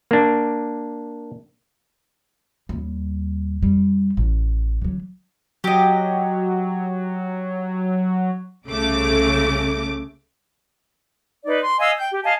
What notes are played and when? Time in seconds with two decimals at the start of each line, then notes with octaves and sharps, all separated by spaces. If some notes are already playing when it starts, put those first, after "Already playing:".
0.11 A#3 D4
2.69 D#2 G3
3.63 F2 G3
4.17 A1
4.82 D3 F#3
5.64 F#3 G4 D#5
8.67 C2 C#3 A3 D6
11.46 D#4 B4 D5
11.61 C6
11.79 D#5 F5 G#5 E6
11.98 G5 G6
12.11 G4
12.24 D#5 F5 G#5 A5